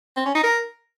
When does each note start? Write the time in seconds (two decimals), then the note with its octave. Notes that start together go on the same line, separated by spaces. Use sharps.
0.16 C4
0.26 C#4
0.34 D#4
0.43 A#4